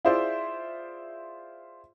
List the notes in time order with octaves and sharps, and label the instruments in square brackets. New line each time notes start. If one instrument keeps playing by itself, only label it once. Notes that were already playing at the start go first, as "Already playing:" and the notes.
[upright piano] E4 F4 G#4 C5 D5 E5